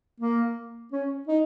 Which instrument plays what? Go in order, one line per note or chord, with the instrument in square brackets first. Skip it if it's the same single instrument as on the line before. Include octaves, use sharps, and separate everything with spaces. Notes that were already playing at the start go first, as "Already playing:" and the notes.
[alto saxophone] A#3
C#4
D#4